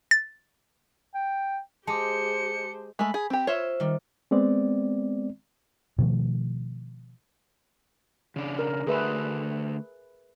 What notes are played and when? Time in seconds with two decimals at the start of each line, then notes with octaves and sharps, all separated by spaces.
0.11 A6
1.15 G5
1.87 G#3 G4 C5 A5 D6 C#7
2.99 G#3 A3 B5
3.14 G#4
3.30 C4 G4
3.47 F4 C5 C#5 E5
3.80 D#3 G3
4.31 G#3 B3 C4 D5
5.98 B2 D#3 F3 A3
8.36 C#3 D4
8.59 A#4
8.87 D3 A3 G#4 B4 C5 E5